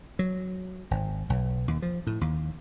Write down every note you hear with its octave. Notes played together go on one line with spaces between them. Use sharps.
F#3
G#1
B1
D#2
F3
A2
D#2